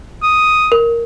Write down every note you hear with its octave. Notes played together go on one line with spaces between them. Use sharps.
D#6
A#4